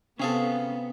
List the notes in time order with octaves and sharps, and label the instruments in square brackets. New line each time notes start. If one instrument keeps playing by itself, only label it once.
[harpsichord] C3 G#4 A4 [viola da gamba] B3 [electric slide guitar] C#4 F5